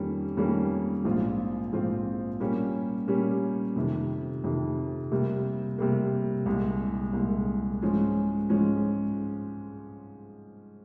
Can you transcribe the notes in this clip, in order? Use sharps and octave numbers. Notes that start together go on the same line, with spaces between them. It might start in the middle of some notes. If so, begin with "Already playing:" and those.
Already playing: F2 D#3 G3 A#3 C#4
F2 D#3 G3 A#3 C#4
A#1 G#2 F3 C4 F4
A#1 G#2 F3 C4 F4
A#2 G3 A#3 C#4 G4
A#2 G3 A#3 C#4 G4
F2 C3 D#3
F2 C3 D#3
C3 G3 A#3
C3 G3 A#3
C2 A#2 G#3
C2 A#2 G#3
G#2 F3 G#3 C#4
G#2 F3 G#3 C#4